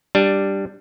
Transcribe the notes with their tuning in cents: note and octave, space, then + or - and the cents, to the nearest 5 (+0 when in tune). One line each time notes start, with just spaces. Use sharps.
G3 +0 D4 +0